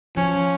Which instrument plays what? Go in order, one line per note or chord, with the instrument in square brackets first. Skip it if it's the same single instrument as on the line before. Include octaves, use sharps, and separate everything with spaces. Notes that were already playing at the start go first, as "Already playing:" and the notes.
[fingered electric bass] F3 [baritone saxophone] C#4